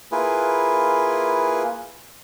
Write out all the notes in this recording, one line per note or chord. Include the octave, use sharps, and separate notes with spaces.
A#3 E4 F4 G#4 B4